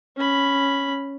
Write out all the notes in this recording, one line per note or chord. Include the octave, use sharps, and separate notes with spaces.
C#4 B5